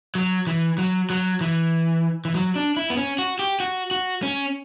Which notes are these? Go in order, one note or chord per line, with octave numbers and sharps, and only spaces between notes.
F#3
E3
F#3
F#3
E3
E3
F#3
D4
E4
B3
C#4
F#4
G4
F#4
F#4
C#4